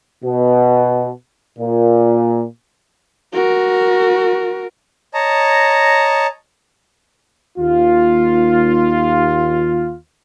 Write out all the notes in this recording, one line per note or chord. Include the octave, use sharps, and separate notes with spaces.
B2
A#2
F#4 A#4
C#5 D#5 A5 A#5
D#2 F4